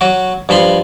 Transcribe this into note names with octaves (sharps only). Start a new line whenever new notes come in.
F#3 F#4
G2 F3 B5 C6